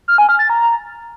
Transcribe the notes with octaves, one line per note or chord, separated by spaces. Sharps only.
F6
G#5
F6
A6
A#5